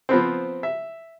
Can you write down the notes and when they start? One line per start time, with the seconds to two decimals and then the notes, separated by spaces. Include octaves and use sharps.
0.09 F3 B3 C4
0.63 E5